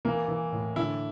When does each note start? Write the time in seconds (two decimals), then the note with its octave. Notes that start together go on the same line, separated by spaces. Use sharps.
0.05 E3 A#3
0.28 E3
0.52 A2
0.76 D3 E4